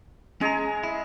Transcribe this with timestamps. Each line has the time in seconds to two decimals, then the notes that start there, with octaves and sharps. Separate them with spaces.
0.41 G#3 C#4 G#4 A#5
0.83 E4